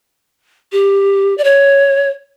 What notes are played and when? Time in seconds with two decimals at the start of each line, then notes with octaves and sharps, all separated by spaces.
0.72 G4
1.38 D5
1.44 C#5